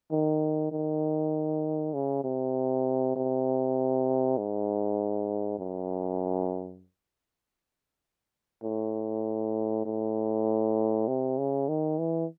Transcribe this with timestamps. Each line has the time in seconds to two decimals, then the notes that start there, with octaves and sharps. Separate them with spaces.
0.11 D#3
0.72 D#3
1.94 C#3
2.24 C3
3.16 C3
4.38 G#2
5.59 F#2
8.64 A2
9.85 A2
11.08 C3
11.38 C#3
11.68 D#3
11.99 E3